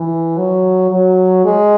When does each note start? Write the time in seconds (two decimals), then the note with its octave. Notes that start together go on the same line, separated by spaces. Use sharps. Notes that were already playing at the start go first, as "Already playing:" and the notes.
Already playing: E3
0.38 F#3
0.91 F#3
1.45 G#3